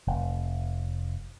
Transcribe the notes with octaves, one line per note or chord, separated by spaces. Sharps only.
F1